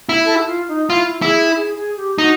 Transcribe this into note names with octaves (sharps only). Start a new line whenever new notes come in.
E4
A4
E4
F4
D#4
E4 F4
E4 G#4
G#4
G#4
G4
D#4 F#4